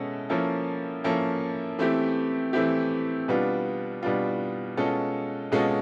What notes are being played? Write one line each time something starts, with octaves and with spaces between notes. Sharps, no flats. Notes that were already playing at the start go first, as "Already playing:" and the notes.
Already playing: B2 G#3 C#4 E4 A4
F3 A#3 C#4 E4 A4
F3 A#3 C#4 E4 A4
E3 A3 C4 E4 G4
E3 A3 C4 E4 G4
B2 G3 B3 D4 F4
B2 G3 B3 D4 F4
B2 G#3 C#4 F4 A4
B2 G#3 C#4 F4 A4